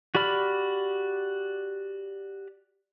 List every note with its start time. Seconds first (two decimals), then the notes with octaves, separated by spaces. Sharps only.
0.15 F#4 G4 D5 B5 F6